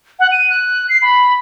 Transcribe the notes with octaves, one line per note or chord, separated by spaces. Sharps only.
F#5
D#7
F#6
C7
B5